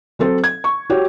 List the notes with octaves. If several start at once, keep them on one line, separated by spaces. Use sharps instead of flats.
F#3 C4 A4 C5
G#6
C#6
F#4 G4 C#5